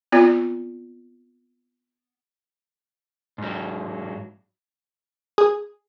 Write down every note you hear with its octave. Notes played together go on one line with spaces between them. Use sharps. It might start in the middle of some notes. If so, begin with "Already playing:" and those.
B3 C4 F4 D5
G#2 F#3
G#4